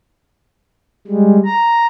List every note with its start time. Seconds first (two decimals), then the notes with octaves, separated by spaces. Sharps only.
1.07 G3 G#3
1.45 A#5